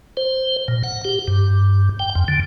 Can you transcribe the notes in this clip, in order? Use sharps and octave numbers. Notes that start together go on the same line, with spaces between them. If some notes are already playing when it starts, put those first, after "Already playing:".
C5
A#2
F#5
G4
G2
G5
F2
D3